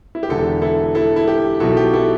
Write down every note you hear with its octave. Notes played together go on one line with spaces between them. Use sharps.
E4
G4
E1 E2 D3 E4 A4
E4 A4
E4 A4
E4
G4
B1 B2 E4 A4
G4
E4 A4